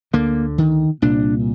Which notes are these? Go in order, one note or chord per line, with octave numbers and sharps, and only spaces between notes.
D2 D3 A#3
D#3
C2 A#2 D4